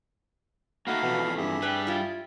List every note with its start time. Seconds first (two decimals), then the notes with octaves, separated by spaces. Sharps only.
0.87 A3 A#3 D#4 F#4 A#4 F5 B5
1.03 F2 B2 E3
1.37 G2 G4 G#4 E5
1.62 G3 B4 G5
1.87 E4 F4